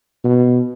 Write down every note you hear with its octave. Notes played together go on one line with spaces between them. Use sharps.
B2